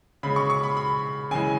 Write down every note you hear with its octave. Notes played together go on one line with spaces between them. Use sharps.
C#3 G#3 B5
C#6
C#6
B5
B5
C#3 E3 G#3 G#5